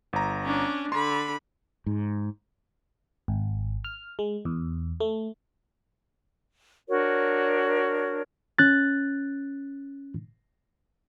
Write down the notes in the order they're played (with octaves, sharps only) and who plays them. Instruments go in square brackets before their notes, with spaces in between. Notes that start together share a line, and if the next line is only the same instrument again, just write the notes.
[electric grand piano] G1 A#5
[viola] C#4 D4
[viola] D3 B5 [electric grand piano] C6
[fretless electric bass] G#2
[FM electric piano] G#1
F6
G#3
E2
A3
[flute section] D4 F#4 A#4 C#5
[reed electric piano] C#4 F#6 A6